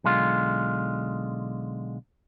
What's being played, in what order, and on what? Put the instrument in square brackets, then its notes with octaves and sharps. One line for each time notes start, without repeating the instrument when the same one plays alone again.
[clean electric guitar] B1 D3 G#3 F4